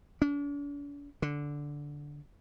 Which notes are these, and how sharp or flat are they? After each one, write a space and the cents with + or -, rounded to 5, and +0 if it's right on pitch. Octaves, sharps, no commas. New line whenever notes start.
D4 -45
D3 -10